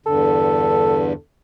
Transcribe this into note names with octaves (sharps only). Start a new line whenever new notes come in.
E2 G2 D3 A4